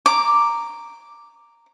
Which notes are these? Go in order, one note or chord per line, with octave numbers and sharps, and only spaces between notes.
A#5 D6